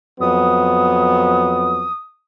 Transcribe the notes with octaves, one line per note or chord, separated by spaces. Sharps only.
F2 F#3 B3 D#6